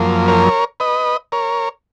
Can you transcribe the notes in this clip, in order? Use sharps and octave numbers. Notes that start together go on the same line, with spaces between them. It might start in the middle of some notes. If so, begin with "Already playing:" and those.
Already playing: F#2 F3 A#3
A#4 C#5
B4 D#5
A#4 C#5